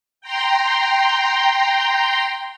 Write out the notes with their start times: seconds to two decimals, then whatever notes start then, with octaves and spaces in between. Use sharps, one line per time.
0.21 G5 A#5 C6